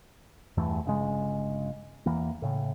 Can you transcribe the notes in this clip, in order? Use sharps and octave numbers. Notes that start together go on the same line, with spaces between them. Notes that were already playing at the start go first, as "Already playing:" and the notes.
E2 G2 E3 A3
G1 C#3 G#3
E2 E3 A#3
A2 C#3